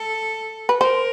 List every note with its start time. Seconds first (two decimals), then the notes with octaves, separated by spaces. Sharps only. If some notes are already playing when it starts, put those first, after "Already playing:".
Already playing: A4
0.69 B4
0.81 A#4 C5